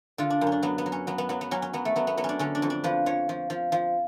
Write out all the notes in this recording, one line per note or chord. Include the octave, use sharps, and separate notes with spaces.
D3 F4
D4
F#2
C#4
D4
F#3 B3
B3
F#3
C#4
F#3 B3
B3
F#3 B3
B3
F#3 C#4
C#4
F#3 B3
A3
F#3 B3
B3
F#3 B3
C#4
D4
D3 C#4
D4
F2
D4
F3 B4
F3 C#5
F3
F3
F3